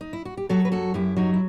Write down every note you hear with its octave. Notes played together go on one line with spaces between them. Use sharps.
D#4
E4
F#4
G4
F#3 F#4 A4
B4
F#2 F#4 A4
F#2 E4 G4
F#3 D#4 F#4
E4